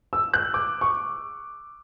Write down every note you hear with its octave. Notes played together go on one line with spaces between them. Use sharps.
E6
F#6
D6
C#6